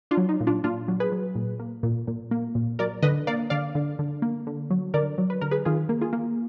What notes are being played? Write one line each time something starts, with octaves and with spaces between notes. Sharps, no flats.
D4 F4
F#3
D#4
A#2
D4 F4
A#2 D4 F4
F#3
G#4 B4
F#3
A#2
A#3
A#2
A#2
A#3
A#2
F#3 A#4 D5
D3 B4 D#5
A#3 D5 F5
D3 D5 F5
D3
D3
A#3
D3
F#3
D3 A#4 D5
F#3
B4
D3 A#4
G#4 B4
D#3 F4 G#4
A#3
F4 G#4
A#3